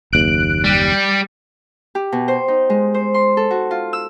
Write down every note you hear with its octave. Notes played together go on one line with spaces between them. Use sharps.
F#1 D#2 F#6 D7
G3
G4
B2
C5
D#4
G#3
C5
C6
A4
F#4
F4
E6